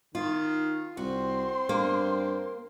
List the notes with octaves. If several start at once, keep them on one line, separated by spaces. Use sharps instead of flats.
D#3 F4
C2 C4 F#4 C6
G2 A#3